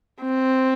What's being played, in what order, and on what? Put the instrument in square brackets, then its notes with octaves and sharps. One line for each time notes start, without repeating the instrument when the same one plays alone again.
[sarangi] C4